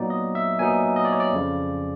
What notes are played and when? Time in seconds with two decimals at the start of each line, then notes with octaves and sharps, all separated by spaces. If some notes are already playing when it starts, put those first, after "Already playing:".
Already playing: A#2 F#3 B3 D#4 D5
0.10 D#5
0.35 E5
0.59 A#2 F#3 B3 D#4 G#5
0.96 D#5
1.05 D5
1.12 C#5
1.20 D5
1.33 F2 C#3 F3